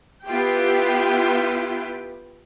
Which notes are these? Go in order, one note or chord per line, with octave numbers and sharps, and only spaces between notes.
B3 E4 F4 G4 G5